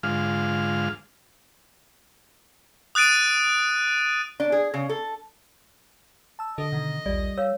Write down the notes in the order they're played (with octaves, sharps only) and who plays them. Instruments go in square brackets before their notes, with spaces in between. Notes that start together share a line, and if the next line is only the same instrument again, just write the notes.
[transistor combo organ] G#2 D3 G#3 F4 F5 F6
[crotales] D#6 F#6 A6 D7 D#7
[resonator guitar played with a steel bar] D4
G#4
C#3
A4
[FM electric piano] A5 E6
[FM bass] D3 [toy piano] A4 [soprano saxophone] D#5
[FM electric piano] B2 D#3
[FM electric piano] A#1 D#2 [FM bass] G3 [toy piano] D5
[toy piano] C#5 F5 [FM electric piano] E6